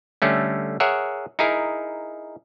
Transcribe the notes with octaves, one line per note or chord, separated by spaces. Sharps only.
D3 G3 A3 C#4
G#4 A#4 C#5 E5 F#5
D#4 E4 G#4 A#4